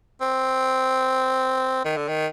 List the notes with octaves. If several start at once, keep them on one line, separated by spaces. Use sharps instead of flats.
C4
D#3
D3
D#3